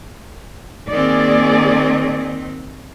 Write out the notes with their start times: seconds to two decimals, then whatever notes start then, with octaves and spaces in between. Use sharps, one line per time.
0.89 D#3 A#3 C4 G#4 D5